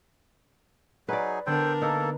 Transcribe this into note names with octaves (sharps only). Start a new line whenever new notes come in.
F#3 D#4 G#4 B4 D5
D3 B3 D4 A4 A#4 C5 G5
A#3 D#4 A4 B4